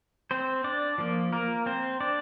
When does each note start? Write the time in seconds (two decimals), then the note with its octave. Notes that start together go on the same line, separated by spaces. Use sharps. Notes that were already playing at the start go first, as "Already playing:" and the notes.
0.31 C4 C5
0.64 D4 D5
0.98 F3 A#3
1.32 A#3 A#4
1.66 C4 C5
2.00 D4 D5